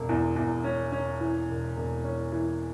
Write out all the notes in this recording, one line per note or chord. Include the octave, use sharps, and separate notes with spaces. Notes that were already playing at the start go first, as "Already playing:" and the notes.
Already playing: E1
E2
E2
C#4
C#4
E3
E1
E1
C#4
E3